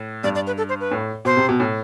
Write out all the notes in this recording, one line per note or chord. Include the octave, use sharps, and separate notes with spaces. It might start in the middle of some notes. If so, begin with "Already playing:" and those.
Already playing: A2
G2 D5
D5
B4
A4
C5
B4
A2
B2 C5
C3
B2
A2